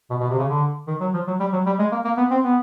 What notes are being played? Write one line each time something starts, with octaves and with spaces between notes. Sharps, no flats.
B2
B2
C3
C#3
D3
D#3
F#3
F3
F#3
G3
F#3
G3
G#3
A#3
A#3
B3
C4
B3